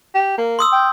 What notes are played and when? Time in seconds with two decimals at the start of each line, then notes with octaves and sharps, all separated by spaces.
0.15 G4
0.38 A#3
0.59 C6 D#6 E6
0.72 G5